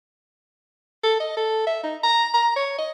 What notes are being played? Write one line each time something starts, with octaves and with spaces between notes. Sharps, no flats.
A4
D#5
A4
E5
D#4
A#5
A#5
C#5
D#5